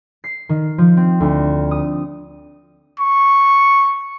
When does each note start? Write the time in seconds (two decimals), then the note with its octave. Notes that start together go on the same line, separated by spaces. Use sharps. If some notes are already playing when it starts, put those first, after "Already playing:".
0.24 C7
0.49 D#3
0.78 F3
0.97 C4
1.20 D2
1.71 D#6
3.00 C#6